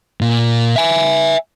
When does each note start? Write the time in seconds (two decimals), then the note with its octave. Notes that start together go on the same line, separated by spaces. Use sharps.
0.21 A#2
0.76 E5 G#5